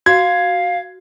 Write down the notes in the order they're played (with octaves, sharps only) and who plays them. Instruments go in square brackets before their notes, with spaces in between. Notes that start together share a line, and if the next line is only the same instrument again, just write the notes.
[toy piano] F#4 [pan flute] F5 [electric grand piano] G#6